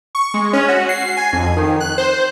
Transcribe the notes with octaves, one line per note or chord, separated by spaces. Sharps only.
C#6
G#3
C#4
F#4
C7
G#5
F2
D#3
F#6
C5